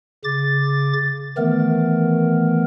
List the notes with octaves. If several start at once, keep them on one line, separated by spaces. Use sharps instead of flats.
C#3 D6 A6
D#3 E3 A3 B3 A#4